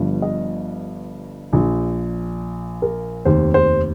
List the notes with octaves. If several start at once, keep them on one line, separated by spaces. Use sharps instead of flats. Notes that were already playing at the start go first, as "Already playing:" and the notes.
Already playing: G1 G2 F3
D#5
A#1 A#2 F3
A#4
F1 D#2 D#3 C5
C5